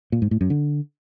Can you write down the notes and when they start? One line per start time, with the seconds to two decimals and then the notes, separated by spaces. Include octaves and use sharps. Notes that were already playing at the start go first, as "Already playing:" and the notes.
0.12 A#2
0.22 G#2
0.31 A2
0.41 F#2
0.50 D3